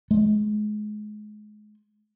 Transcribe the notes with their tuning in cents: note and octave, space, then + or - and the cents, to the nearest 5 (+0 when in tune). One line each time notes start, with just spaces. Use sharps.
G#3 +30